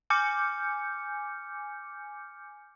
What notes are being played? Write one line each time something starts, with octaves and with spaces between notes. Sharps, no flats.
G#5 D6 F6 G6 C#7